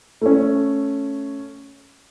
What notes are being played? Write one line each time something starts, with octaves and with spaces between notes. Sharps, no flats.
A3 C#4